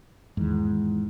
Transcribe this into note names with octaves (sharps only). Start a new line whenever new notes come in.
E2 G#2 D#3